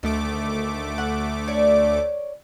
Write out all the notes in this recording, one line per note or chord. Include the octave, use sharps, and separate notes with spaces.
D2 D#3 A3 D6
F#5
C#5 D5